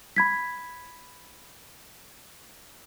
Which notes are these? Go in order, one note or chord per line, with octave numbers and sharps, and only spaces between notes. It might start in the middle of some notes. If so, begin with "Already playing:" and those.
B5 G#6 B6